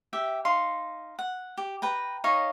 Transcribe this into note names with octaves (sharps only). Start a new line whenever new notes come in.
G4 E5 G5
D#4 F5 C6
F#5
G4
B4 G5 A#5
D#4 C#5 D#5 F5